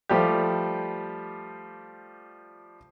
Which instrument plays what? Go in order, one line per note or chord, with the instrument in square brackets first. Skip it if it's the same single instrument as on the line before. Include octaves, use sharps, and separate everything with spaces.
[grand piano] F3 G3 A3 G4